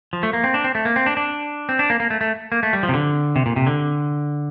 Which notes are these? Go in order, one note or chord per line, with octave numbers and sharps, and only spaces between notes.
F3
A3
A#3
C4
D4
C4
A3
A#3
C4
D4
D4
C4
D4
A#3
A#3
A3
A3
A#3
A3
G3
F3
C3
D3
C3
A#2
C3
D3